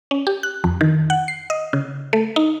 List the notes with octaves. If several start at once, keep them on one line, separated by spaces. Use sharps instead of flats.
C#4
G4
F#6
F2
D#3
F#5
C7
D#5
C#3
A3
D#4